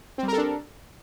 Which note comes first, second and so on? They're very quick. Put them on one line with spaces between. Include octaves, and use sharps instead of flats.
C4 G3 A#4 A4 D4